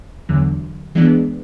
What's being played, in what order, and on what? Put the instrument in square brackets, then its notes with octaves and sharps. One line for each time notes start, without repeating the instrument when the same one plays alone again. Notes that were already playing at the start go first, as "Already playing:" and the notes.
[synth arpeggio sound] E2 D3 F#3
E3 G#3 B3 D4